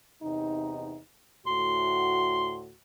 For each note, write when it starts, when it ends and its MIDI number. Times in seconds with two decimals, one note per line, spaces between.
0.23 0.99 40
0.23 0.99 48
0.23 0.99 63
1.47 2.74 38
1.47 2.74 45
1.47 2.74 66
1.47 2.56 84